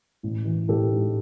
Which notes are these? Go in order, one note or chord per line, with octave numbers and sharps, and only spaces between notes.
A1
E3
A1 G4 A4
G#2